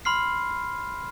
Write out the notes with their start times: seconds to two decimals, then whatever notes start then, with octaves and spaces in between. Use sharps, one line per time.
0.05 B5 C6 F6 C7